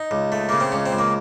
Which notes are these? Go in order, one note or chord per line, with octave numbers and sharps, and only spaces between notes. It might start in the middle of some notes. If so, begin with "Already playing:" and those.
Already playing: D#4
C#2
A3
C#3 A#3
C4
C#2 C#4
C4
C#2
A#3